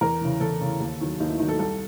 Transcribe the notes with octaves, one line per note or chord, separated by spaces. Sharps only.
E2 A#4
C#3 E3
E2 A4
C#3 E3
D#2
D#3 F#3
D#2 D#4
E4
D#3 F#3 D#4
A4
C2 A4